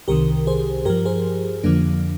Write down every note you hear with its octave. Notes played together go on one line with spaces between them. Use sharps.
C2 C3 D#3 G4 A#4
G#4 C5
G2 F3 G4 A#4
G#4 C5
F2 D3 F3 A#3 D4